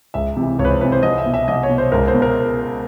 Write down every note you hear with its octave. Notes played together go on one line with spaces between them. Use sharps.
C#2 E5
C3 E3
C#2 C#5
B4
C5
C3 E3 B4
C5
C2 D#5
E5
B2
E5
C2 D#5
C#5
B2
C5
C#2 A#4
C5
B2
A#4